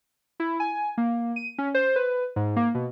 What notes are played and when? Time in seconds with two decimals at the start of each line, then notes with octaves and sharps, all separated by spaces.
0.40 E4
0.60 G#5
0.98 A#3
1.36 D#7
1.58 C#4
1.75 C5
1.96 B4
2.36 G#2
2.56 A#3
2.75 B2